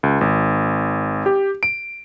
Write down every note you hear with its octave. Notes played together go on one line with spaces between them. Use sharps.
C#2
G#1
G4
D7